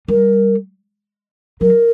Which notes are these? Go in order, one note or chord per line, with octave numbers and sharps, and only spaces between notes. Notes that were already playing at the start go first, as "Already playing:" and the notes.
G3 A#4
F#3 A#4